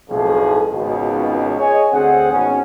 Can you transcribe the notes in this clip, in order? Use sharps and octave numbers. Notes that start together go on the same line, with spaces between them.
B1 F2 A2 G#4
G#1 C#2 B2
G#4 C#5 D#5 G#5
D2 C4 G#4 F#5
G#1 B2 C#4 G#5